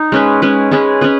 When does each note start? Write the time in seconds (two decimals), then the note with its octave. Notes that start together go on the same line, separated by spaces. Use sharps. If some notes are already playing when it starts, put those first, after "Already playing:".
Already playing: D#4
0.12 G#3 C#4 G#4 B4
0.42 G#3 C#4 G#4 B4
0.71 G#3 C#4 G#4 B4
1.01 C#4 G#4 B4